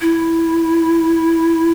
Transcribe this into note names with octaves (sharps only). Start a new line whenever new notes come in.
E4